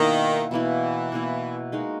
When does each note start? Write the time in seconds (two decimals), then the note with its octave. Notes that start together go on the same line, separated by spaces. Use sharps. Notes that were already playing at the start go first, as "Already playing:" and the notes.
Already playing: B2 D#3 A#3 E4
0.51 B2 E3 A#3 E4
1.12 B2 A#3 E4
1.72 G#3 D#4 F#4 A#4